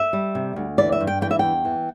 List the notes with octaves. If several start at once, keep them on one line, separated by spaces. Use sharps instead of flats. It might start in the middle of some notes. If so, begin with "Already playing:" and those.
Already playing: E5
G3
C3
D2
E3 D5
E5
G2
G5
E3 G5
E5
E2 G5
E3